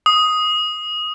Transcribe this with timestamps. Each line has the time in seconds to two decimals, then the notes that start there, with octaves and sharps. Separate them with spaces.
0.06 D#6